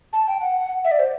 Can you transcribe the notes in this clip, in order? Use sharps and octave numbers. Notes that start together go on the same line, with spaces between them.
A5
G5
F#5
E5
D5
C5